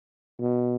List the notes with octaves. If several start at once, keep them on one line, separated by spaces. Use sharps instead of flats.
B2